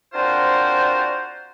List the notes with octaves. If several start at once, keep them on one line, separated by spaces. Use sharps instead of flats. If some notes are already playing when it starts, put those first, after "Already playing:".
C4 D4 F4 F#4 A#4 C5